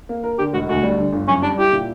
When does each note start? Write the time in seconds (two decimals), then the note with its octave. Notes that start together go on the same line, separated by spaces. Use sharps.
0.09 A#3
0.24 A#4
0.38 D3 G4
0.53 E1 F#4
0.69 D2 F#4
0.83 G3
0.98 D3
1.13 G1
1.28 F#2 C#4
1.42 G3 D4
1.58 E4 G4
1.72 A#2